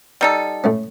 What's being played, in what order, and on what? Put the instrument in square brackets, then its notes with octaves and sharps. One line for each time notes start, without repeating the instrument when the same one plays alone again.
[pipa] G3 D#4 A4
[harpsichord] A2 A3 C#4